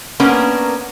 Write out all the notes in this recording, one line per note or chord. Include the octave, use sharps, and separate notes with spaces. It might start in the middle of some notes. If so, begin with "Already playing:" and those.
A#3 B3 C#4 D4 A#4